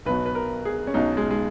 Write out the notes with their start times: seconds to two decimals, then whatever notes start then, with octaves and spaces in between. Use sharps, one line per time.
0.06 B1 B2 F#3 B4
0.26 B4
0.35 A#4
0.65 G#4
0.87 C#4
0.94 B1 B2 F#3 D#4
1.17 G#3
1.31 G#3